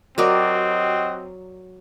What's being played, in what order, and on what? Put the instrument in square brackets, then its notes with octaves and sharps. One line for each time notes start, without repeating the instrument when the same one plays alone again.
[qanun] F#3 A#4 D5 [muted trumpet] C4 [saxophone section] F#4 G4 D#5